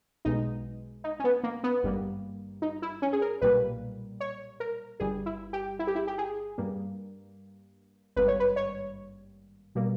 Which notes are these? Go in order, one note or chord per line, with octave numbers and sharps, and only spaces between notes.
B1 B2 G#3 D#4
D#4
C#4
B3
A#3
B3
G#1 G2 G3 A#3
D#4
E4
C#4
G#4
A#4
B1 A#2 G3 A#3 B4
C#5
A#4
G1 G2 G3 G#4
E4
G4
E4
G4
E4
G4
G#4
G2 G3 A#3
G#1 G2 G3 A#3 B4
C#5
B4
C#5
B2 G3 A#3